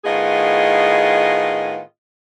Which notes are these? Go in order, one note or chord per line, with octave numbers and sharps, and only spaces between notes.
A2 D#3 B3 F4 G#4 D#5